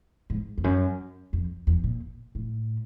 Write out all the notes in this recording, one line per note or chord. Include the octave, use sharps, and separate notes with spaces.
G#2
F2
F#2
F2
E2
A#2
A2